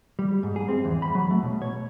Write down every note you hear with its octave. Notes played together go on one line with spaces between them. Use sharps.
G3
G#2
G#4
C4
E2
B5
F#3
A3
B2
C#5